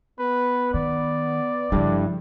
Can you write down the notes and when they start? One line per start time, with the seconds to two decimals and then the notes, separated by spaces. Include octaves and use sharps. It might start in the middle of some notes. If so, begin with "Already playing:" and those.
0.19 B3 B4
0.74 D#3 D5
1.72 G2 C#3 F3 D4 E4 A4